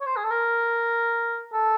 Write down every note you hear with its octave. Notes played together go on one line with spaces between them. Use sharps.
C#5
C5
G#4
A4
A#4
A4